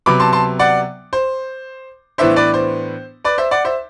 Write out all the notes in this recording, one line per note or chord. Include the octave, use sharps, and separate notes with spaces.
C3 F#3 B3 B5 D6
A5 C6
A5 C6
D5 F#5
C5
A2 E3 B3 D4 C5 E5
B4 D5
C5
B4 D5
C5 E5
D5 F#5
C5 E5